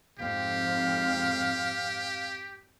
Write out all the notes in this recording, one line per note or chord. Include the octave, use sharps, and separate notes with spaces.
F2 G#2 C4 G4 F5